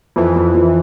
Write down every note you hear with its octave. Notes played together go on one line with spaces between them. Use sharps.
F2 E3
F2
F2